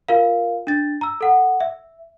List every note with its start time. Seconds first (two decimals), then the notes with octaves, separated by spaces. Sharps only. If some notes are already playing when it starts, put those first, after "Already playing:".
0.08 F4 A#4 F5
0.67 D4 A6
1.01 A#5 E6
1.21 A4 F#5
1.60 E5